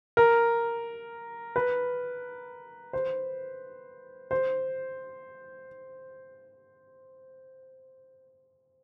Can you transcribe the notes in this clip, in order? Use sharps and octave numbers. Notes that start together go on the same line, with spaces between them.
A#4
B4
C5
C5